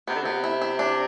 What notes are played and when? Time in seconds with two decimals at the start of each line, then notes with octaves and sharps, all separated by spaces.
0.08 C3 B3
0.15 D3
0.22 C3 B3
0.44 E4
0.62 E4
0.79 D4